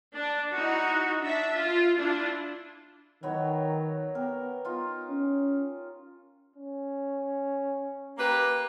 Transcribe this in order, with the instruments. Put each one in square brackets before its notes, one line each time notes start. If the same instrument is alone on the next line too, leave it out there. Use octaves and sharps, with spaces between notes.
[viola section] D4
D#4 E4 F#4
D4 E5
F4
D4 E4 F4
[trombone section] D#3 [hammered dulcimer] F#3 B3 C#5
[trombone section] B3 [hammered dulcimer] G4 A#4
[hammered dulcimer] D#4 F4
[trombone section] C#4
[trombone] C#4
[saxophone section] A#3 G4 B4